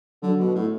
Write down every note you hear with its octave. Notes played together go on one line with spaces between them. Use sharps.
D3 F#3
B2
A2